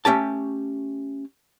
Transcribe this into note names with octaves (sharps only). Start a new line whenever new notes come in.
A3 C#4 G4 A5